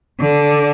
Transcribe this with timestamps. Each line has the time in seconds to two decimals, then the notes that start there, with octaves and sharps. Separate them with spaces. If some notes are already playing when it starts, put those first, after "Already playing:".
0.20 D3